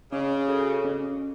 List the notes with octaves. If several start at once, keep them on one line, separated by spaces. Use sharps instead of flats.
C#3 C#4
F#4 A4 C#5
C#4